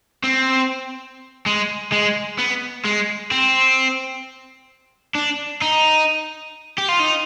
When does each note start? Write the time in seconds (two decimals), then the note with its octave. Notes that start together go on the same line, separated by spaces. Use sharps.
0.24 C4
1.46 G#3
1.92 G#3
2.38 B3
2.85 G#3
3.31 C4
5.15 D4
5.62 D#4
6.78 G4
6.89 F4
7.00 D#4